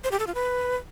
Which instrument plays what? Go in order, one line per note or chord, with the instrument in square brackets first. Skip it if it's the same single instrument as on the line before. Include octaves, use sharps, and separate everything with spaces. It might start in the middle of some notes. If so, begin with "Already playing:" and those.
[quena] C5
G4
A4
F4
B4